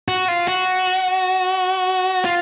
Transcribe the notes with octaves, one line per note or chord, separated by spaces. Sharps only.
F#4
F4
F#4
F4